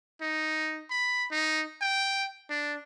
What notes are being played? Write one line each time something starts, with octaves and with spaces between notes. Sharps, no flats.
D#4
B5
D#4
G5
D4